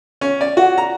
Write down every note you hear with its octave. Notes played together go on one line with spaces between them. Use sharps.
C#4
D5
F#4
A#5